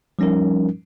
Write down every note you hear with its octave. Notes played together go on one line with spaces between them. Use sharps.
F3 G3 C#4 D#4 A#4